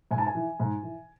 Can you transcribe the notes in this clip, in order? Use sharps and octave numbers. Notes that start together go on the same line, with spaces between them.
G#2 G#5
A5
G#5
E3
G#2
E3